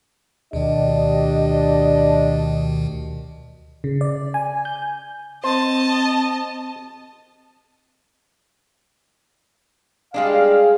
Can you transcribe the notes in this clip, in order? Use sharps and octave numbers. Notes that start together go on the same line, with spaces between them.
D2 B2 D#3 D4 G4 D#5
C#3
D5
G#5
G6
C4 C5 D#5 A5
G3 G#3 D4 G#4 F5